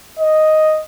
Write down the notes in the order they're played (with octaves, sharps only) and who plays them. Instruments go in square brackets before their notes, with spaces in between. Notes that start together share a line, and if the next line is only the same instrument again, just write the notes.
[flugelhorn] D#5